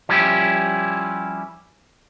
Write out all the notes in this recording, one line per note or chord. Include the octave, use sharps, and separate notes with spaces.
F3 G3 C#4 E4 G4